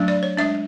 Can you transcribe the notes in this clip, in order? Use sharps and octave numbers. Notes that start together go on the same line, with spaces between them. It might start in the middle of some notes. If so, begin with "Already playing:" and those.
Already playing: F#3 A3 D4
D5
C#5
G#3 D4 E5